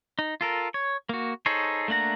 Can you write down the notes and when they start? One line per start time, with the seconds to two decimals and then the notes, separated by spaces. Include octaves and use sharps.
0.19 D#4
0.41 F4 A4 A#4
0.74 C#5
1.09 A#3 F#4
1.46 D#4 G#4 A4 C5 C#5
1.88 A3 A#3 D4 F#5 A#5